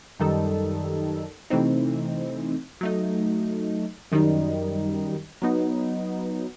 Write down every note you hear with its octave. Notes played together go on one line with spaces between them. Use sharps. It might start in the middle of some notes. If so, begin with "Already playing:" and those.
F#2 D#3 G3 D#4 A4
C3 E3 A3 C4 D#4
F#3 A3 D#4
F#2 D#3 G3 D#4
F#3 B3 D#4